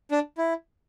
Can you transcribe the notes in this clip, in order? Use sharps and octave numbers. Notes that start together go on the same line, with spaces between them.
D4
E4